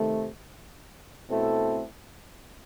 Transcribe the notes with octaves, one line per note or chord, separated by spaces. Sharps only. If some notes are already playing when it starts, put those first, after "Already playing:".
Already playing: C3 D#3 A3
B2 A3 C4 E4 A4